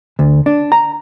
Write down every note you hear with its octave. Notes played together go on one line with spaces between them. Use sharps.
D2
D4
A#5